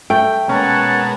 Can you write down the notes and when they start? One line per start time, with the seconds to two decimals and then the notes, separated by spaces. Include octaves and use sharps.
0.10 A3 G5
0.49 B2 G#3 A#3 C#4 C#5 F#5 A5